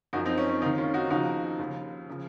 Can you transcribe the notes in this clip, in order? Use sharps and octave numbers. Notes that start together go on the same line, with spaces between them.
F#2 F3 D#4 F#4
C4 D#4
C#4
C#4
D#2 D#3 C4 D#4
C#4 F4
D#4 F#4
D#2 C#3 F3 D#4 F#4
D#2 C#3 F3
C#3 F3